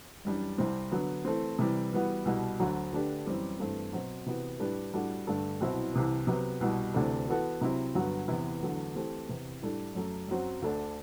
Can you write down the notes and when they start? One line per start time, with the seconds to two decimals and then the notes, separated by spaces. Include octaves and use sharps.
0.25 F#2 E3 G3 D4
0.58 C2 C3 G3 C4
0.92 D3 F#3 B3
1.25 E3 A3 C4
1.59 C3 E3 G3
1.92 E3 G3 B3 F#4
2.25 C2 B2 G3
2.60 D2 D3 F#3
2.93 D3 A3 D4 G4 B4
3.26 F#2 E3 G3 C4 G4
3.59 G2 E3 A3 C4
3.93 B2 F#3 C4 F#4
4.26 C3 E3 B3 F#4
4.59 A2 G3 D4 G4 B4
4.94 A2 G3 D4 F#4 A4
5.27 G2 D3 A3 D4 A4
5.60 C2 B2 F#3 C4 E4
5.94 C2 C3 E3
6.27 C3 F#3 B3
6.61 C2 B2 G3
6.94 D2 C3 E3 A3 D4
7.28 E3 B3 F#4 A4
7.61 C3 F#3 C4 E4
7.95 G2 D3 F#3 B3 F#4
8.28 E2 C3 E3 B3 E4
8.62 E2 D3 F#3 A3
8.95 E3 A3 C4 G4
9.28 E2 C3 E3
9.62 A2 G3 D4 A4
9.95 F#2 F#3 A3
10.28 F#2 F#3 C4 F#4
10.62 D2 D3 A3 D4 A4